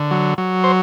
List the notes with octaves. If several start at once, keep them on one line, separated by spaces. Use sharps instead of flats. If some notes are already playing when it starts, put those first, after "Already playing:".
Already playing: D3
F#3
F#3
C5